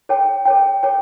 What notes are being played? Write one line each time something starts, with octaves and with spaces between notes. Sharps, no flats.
A4 C#5 G5
A4 C#5 G5
A4 C#5 G5